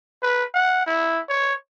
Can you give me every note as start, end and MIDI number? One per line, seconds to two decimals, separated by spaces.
0.22 0.44 71
0.54 0.83 78
0.86 1.20 64
1.29 1.54 73